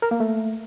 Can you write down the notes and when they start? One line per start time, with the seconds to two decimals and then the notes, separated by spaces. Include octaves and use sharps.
0.02 A#4
0.11 A#3
0.20 A3